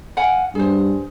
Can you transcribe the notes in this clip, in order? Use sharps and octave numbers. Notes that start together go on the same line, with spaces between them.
F5 F#5 G#5
G2 G#4 C5